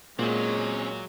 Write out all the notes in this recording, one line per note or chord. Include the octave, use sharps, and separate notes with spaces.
A#2 F#3 G#3 C4 C#4